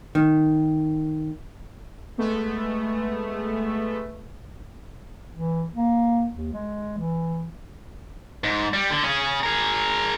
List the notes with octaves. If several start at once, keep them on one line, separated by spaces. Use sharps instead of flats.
D#3
G#3 A3 B3
E3
A#3
D#2
G#3
E3
G#2
G3
D3
C#4 G#4
G#4 A#4